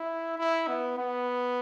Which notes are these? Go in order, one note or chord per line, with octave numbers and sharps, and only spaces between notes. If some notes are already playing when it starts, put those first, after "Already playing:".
Already playing: E4
E4
B3
B3